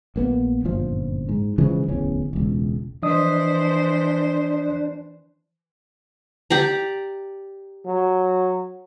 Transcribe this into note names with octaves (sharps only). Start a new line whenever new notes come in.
A#1 A#3 B3
G1 F#2 A#2 F3
G#2
C#3 E3 F3 G#3
D1 A1 E2 C#4
E1 C#2
E3 F3 D4 C5 D#5 D#6
G4 D5 A#5
F#3